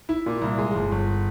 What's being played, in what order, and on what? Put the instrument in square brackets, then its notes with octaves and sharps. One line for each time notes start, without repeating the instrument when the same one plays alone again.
[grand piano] E4
A#2
C2
G#3
G1
G1